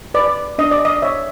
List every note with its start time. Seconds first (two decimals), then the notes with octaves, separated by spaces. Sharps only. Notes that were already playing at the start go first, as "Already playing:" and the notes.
0.14 B4 D5
0.58 D4 D#5
0.71 D5
0.85 D#5
1.02 C#5 E5